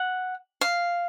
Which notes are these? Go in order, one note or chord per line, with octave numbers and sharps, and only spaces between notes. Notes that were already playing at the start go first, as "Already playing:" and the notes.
Already playing: F#5
F5